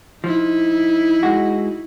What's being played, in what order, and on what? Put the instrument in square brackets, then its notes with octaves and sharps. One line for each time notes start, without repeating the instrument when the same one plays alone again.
[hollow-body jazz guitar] F3 [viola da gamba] D#4 E4
[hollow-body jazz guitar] G#3 F#4